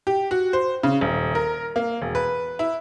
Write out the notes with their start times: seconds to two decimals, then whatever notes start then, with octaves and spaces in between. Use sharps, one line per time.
0.07 G4
0.31 F#4
0.53 C5
0.83 C#3
1.01 D#1
1.35 A#4
1.76 A#3
2.02 E1
2.15 B4
2.59 E4